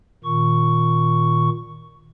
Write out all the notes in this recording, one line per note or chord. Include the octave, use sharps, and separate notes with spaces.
A#2 D#3 C#6